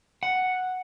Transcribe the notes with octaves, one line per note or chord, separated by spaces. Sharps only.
F#5